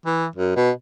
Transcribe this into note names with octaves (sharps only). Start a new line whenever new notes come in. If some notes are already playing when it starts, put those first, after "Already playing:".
E3
F#2
B2